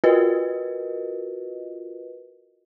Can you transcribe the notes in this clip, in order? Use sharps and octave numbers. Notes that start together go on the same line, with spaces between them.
F4 F#4 A#4 B4 D#5